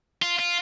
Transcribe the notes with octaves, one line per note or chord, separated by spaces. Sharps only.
F4
F4